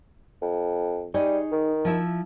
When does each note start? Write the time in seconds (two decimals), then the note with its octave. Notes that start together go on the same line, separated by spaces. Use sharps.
0.42 F2
1.14 G3 D#4 G#4 C#5
1.52 D#3
1.85 F3 E4 E5